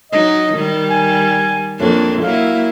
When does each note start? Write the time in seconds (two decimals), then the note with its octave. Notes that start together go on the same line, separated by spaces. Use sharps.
0.12 F#3 D#4 D#5
0.54 D#3 G3
0.90 G#5
1.80 F2 A#3 D4 C#5
2.22 F#3 A#3 E4 F5